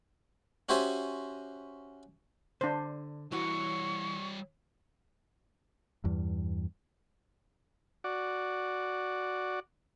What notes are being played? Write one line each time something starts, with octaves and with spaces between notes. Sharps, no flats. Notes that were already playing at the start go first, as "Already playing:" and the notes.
C#4 F#4 G4 C5 E5 G#5
D3 D4 C5
E3 G3 E4 F#4 C#5 C#6
E2 G2
F#4 D5